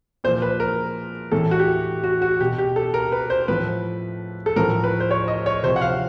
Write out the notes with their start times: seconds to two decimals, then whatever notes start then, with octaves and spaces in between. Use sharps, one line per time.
0.24 A#2 C5
0.28 F3
0.42 B4
0.60 A#4
1.32 A2 E3 A4
1.51 F#4
1.59 G4
2.04 F#4
2.22 F#4
2.40 B2 G4
2.58 G4
2.76 A4
2.94 A#4
3.12 B4
3.30 C5
3.48 A2 F3 B4
4.46 A4
4.56 A2 F3 A#4
4.84 B4
5.00 C5
5.11 C#5
5.28 D#5
5.46 C#5
5.64 C3 F3 C5
5.76 F#5
5.81 F5